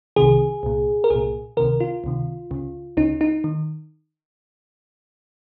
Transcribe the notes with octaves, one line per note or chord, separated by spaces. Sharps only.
C2 C3 D#3 G#4
C2 A#2
A#4
C2 A#2 G#4
C#2 C3 D#3 A#4
F4
C#2 C3 D#3
C#2 C#3
C#2 C#3 D#4
D#4
D#3